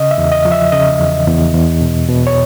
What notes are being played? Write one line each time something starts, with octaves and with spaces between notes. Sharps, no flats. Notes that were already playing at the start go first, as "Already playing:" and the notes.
Already playing: C#3 D#5
E5
E2
D#5
F3
E5
C#3 D#5
E2
E2
E2
B2
B2
C#5